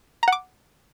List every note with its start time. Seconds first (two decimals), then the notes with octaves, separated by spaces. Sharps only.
0.23 A#5
0.28 F#5
0.32 D6